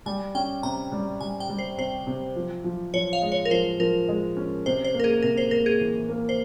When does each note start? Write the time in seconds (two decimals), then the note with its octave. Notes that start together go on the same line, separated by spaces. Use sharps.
0.06 G3 G#5
0.35 C#4 G5
0.63 C3 A#5
0.92 G3
1.21 G3 G#5
1.40 G5
1.49 G3
1.59 C5
1.78 C3 C5
2.07 C3
2.36 F3
2.64 F3
2.93 F3 C#5
3.13 F5
3.22 G#3
3.32 C#5
3.45 A#4
3.51 F3 C5
3.79 F3 A#4
4.08 G#3
4.37 C#4
4.66 C3 C5
4.84 C5
4.94 A#3
5.00 A#4
5.04 G#4
5.22 C3 A#4
5.37 C5
5.51 A#3 A#4
5.66 G#4
5.81 E3
6.09 A#3
6.29 C5